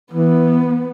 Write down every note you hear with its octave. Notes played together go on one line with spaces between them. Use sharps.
E3 B3